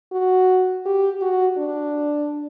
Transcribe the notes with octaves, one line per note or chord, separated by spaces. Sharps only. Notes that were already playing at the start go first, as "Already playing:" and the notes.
F#4
G4
F#4
D4